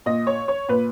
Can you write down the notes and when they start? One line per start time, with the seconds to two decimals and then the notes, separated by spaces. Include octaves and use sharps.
0.06 A#2 D#5
0.27 C#5
0.48 C#5
0.69 A#2 B4